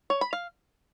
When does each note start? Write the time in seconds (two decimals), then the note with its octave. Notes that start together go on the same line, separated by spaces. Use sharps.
0.10 C#5
0.21 B5
0.33 F5